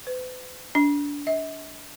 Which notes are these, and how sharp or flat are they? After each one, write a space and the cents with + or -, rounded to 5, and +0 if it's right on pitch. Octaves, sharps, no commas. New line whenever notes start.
B4 +45
D4 -25
E5 -45